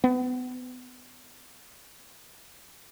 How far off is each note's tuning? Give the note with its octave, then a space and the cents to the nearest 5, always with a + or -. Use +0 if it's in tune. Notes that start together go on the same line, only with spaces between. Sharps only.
B3 +30